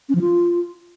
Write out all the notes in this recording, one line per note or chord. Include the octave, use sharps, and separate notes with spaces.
C#4
F3
F4